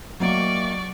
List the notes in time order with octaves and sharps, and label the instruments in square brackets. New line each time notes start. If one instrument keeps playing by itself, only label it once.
[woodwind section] D#3 A3 A#3 [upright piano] F#3 [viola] D5 C#6